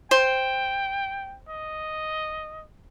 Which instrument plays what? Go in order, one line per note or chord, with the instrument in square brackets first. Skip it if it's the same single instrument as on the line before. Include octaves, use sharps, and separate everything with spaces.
[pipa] C5 [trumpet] G5
[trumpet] D#5